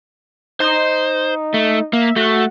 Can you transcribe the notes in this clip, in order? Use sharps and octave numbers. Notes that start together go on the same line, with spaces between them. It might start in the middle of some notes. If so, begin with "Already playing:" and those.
D#4 C5
A3
A#3 E5
A3 F#4